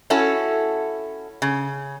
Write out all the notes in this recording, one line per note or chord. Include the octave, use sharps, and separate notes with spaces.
C#4 E4 F#4 A4
C#3